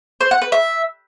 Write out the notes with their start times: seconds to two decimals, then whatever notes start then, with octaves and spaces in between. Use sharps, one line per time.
0.21 C5
0.31 F#5
0.42 B4
0.52 E5